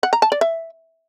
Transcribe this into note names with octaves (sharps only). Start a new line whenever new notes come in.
F#5
A#5
A5
D5
E5